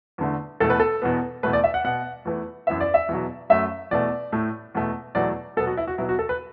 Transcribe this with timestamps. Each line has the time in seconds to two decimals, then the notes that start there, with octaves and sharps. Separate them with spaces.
0.18 E2 D3 A3
0.60 E2 B2 A3 A4
0.70 B4
0.80 A4
1.02 E2 B2 B3
1.43 E2 B2 A3 B4
1.53 D5
1.64 E5
1.74 F#5
1.84 B2 B3 F#5
2.25 E2 E3 A3
2.67 F#2 E3 B3 E5
2.81 D5
2.94 E5
3.09 E2 B2 F#3
3.50 F#2 F#3 A3 E5
3.91 E2 B2 A3 D5
4.32 A2 A3
4.75 E2 B2 A3
5.15 E2 B2 F#3 A3 D5
5.57 B2 F#3 B3 A4
5.67 F#4
5.77 E4
5.87 F#4
5.98 B2 F#3 B3 E4
6.09 F#4
6.19 A4
6.29 B4